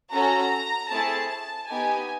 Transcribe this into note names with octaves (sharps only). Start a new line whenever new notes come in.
C#4 F#4 A4 A#5
A3 C4 E4 G#4 A5
A5
B3 D#4 G4 G#5